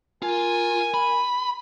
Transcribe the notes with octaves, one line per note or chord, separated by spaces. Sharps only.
F4 A#4 G#5
B5